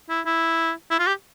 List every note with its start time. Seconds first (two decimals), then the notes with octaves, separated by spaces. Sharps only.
0.09 E4
0.26 E4
0.90 E4
0.99 F4
1.07 G4